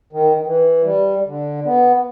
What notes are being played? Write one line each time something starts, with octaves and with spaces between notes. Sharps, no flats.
D#3
E3
G3
D3
B3